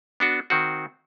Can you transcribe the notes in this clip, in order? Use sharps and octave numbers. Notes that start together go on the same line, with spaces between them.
B3 D4 F#4
D#3 C4 F#4